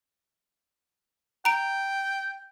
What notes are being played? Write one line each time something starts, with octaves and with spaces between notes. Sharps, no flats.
G5 A#5 D7